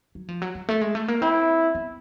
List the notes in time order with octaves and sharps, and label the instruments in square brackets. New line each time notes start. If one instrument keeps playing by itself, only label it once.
[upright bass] F#3
F3
F#3
F#3
A3
G#3
A3
A#3
[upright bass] C4 [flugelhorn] E4
[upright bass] B3